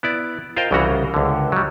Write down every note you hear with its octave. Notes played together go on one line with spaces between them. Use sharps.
B3 E4 D5
F4 A#4 C5 D#5 F5 G5
C2 C#3 E3 C#4 F#4 A#5
C#2 D3
F#3 G3